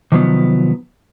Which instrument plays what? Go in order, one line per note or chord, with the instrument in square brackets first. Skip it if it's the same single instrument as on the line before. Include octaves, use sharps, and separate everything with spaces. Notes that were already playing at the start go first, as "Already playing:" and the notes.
[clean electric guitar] C3 D#3 F3 F#3 B3